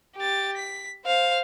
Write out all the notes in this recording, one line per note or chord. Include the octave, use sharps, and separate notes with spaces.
G4 A6
B6
C5 F5